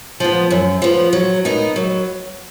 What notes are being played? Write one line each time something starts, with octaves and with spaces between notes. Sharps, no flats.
F3 B3
F#2
F3 B3
F#3
B3 D#4 A#4 D#5
F#3